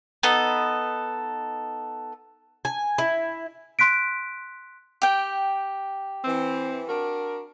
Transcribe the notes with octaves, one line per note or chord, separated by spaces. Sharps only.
B3 D#4 A4
G#5
E4
C6 F#6 B6 D7
G4 G5
E3 C4
D4 F#4 A#4